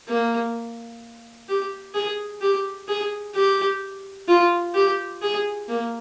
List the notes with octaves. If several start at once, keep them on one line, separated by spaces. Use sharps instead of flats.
A#3
G4
G#4
G4
G#4
G4
F4
G4
G#4
A#3